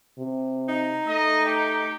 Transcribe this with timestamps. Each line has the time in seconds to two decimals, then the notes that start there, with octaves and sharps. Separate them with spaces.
0.18 C3
0.69 D#4 A#5
1.07 A3 D#5
1.45 G4